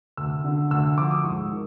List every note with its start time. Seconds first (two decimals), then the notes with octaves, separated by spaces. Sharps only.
0.17 D2 E6
0.44 D3
0.71 D2 E6
0.98 F3 D6
1.11 D#6
1.24 G#2 C#6
1.51 D#3